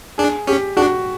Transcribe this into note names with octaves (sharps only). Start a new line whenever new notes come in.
D4 G#4
C#4 G4
D4 F#4